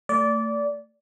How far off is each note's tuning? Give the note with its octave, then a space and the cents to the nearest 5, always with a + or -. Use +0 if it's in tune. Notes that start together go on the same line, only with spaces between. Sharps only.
A3 +30 D5 -20